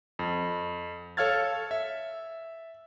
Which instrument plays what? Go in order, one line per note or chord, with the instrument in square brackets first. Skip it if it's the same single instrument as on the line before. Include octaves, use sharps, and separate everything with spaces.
[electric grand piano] F2
A4 C#5 F5 F6 G#6 A6
E5